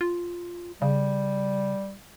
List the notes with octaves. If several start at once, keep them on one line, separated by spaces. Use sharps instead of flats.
F4
C#3 G3